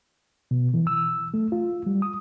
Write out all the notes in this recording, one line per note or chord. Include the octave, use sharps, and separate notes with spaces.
B2
E3
E6
A3
F4
G3
D#6